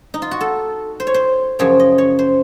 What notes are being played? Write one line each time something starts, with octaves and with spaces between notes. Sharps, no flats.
D#4
F4
F#4
A4
C5
C#5
C5
F#2 C#3 F3 C#5
D#5
C#5
C5